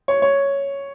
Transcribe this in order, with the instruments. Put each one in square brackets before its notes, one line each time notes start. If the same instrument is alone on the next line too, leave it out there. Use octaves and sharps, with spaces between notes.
[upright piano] C#5
C#5